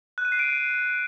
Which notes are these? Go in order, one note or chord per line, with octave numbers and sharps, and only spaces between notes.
F#6
D#7
C7
D7